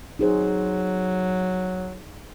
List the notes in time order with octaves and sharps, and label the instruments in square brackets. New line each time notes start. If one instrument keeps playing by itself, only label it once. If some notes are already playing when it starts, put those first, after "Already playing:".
[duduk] F#3 [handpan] D#4 G#4 C5